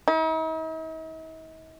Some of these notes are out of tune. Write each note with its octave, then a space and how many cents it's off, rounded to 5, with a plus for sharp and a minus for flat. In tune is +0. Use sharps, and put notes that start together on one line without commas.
D#4 +45